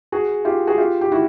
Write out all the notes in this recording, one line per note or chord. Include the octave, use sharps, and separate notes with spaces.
F#4 G#4
F4 G4
F#4 G#4
F4 G4
G4
E4 F#4